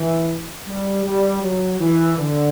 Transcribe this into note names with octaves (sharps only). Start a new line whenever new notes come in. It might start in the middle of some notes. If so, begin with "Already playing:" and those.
Already playing: E3
G3
G3
F#3
E3
D3